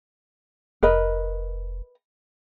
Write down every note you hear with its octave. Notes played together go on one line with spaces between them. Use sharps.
F1 A#4 B4 D#5